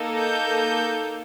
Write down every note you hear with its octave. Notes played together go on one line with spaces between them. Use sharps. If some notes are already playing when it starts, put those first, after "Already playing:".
Already playing: A#3 D#4 A4
G6